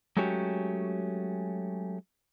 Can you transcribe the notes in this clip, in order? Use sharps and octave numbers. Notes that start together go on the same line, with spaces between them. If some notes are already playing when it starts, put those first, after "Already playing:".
F#3 G#3 A3 C#4 F#4 G4